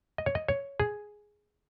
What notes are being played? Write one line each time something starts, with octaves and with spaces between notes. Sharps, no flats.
D#5
C#5
D#5
C#5
G#4